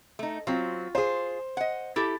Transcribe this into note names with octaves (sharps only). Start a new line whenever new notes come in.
A3 D#4
F#3 C4 F4
F4 G#4 C5
D#5 F#5
E4 G4 A4 A6